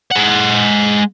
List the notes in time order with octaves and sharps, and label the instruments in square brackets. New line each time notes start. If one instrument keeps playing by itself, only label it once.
[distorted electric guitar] G#3 F#5